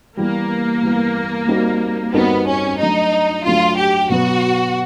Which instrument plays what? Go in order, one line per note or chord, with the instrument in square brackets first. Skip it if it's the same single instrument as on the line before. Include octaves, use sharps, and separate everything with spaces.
[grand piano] E3 G3 B3 [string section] A#3
[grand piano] E3 G3 B3
G3 C4 D#4 F#4 A#4
[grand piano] G3 C4 D#4 F#4 A#4 [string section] B3
[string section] C#4
[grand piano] F#3 A3 D4 F#4 [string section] D#4
[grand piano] F#3 A3 D4 F#4 [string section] F4
[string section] G4
[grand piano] B2 F#3 B3 [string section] F#4